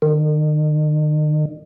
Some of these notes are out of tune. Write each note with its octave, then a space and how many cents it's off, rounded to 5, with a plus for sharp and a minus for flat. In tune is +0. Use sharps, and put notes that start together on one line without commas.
D#3 -40